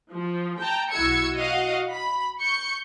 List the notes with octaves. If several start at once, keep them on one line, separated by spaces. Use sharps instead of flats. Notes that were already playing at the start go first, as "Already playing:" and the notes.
F3
G5 A5 A#5
B1 E4 F#4 E6 G#6 C#7
F#4 D#5 F5 F#5
B5
C#6 G6 C#7